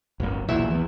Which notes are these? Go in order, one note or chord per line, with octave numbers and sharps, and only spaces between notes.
D1 G1 F#2
B1 E2 A#2 E4 E5
E3 B3